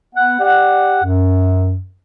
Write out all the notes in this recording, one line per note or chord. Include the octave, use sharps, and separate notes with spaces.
B3 F#5
G4 D5 F#5
F#2